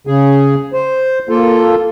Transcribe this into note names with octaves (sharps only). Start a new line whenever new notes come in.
C#3 G#4
C5
A#3 F4 A4